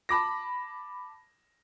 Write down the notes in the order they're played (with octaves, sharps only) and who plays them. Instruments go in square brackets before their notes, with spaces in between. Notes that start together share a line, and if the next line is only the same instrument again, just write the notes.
[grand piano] A5 B5 D6 A#6